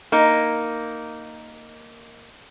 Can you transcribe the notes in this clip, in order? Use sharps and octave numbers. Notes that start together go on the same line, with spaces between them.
A#3 D#4